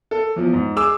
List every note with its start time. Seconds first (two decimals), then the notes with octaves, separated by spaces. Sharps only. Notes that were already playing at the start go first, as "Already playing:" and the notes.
0.11 A4
0.36 E2 F3
0.53 G#2
0.76 G#4 D6 E6